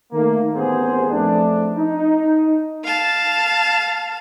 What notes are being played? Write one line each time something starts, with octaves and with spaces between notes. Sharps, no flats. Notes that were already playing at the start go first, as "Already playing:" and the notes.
D#3 A3 A#3
A1 D#2 B3 C4 G#4 C5
F2 A3 D4
D#4
F5 A5